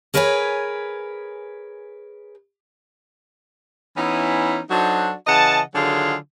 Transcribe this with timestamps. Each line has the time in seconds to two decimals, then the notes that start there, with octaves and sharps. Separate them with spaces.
0.14 G#4 A#4 B4 C#5 F#5 G#5
3.96 E3 B3 C#4 D#4 E4
4.70 F#3 D4 D#4 F#4 A4 C5
5.27 C#3 E3 D#5 F#5 A5
5.74 D3 D#3 F#3 F4 G#4